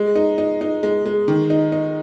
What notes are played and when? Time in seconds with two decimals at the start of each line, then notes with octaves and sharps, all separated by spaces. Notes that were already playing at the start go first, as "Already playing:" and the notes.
Already playing: G#3
0.15 D#4
0.38 D#4
0.61 D#4
0.83 G#3
1.06 G#3
1.28 D#3
1.50 D#4
1.72 D#4